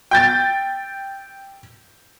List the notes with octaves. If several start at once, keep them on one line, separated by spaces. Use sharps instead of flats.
G5 G6 A6